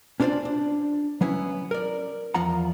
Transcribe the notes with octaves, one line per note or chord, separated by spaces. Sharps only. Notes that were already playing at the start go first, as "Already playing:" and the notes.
C#4 D4 F4 A#4 C5 D5
D4
F#3 B3 C#4 E4
A#4 D5
E2 F3 F4 F#5 A#5